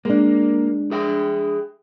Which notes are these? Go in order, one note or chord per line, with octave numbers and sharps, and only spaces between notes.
G#3 A#3 D4
G#4 E5 G5